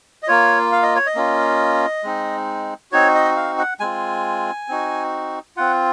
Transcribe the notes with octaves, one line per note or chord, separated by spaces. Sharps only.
D#5
A#3 F4 C#5
F5
D#5
C#5
D#5
A#3 C#4 F4
G#3 C4 D#4
C4 D#4 F#4 C#5
D#5
F5
F#5
G#3 C4 F4 G#5
C4 D#4 F#4
C4 F4 F#5